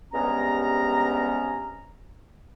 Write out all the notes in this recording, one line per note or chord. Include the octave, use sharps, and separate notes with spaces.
C#2 G2 C3 B3 C#4 A#5